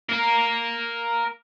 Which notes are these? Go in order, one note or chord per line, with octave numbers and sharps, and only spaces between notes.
A#4 F5